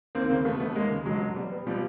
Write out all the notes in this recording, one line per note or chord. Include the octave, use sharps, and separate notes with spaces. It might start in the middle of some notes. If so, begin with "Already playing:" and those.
D#2 A#3 C4
C#3 A#3 C4
E1 A3 B3
E1 A3 B3
D#2 G#3 A#3
C#3
E1 F#3 G#3
E1
G3
B3
B2 F3 G3